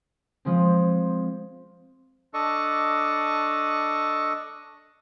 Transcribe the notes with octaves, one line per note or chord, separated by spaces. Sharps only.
F3 G#3 C4
D4 A4 D#5 C#6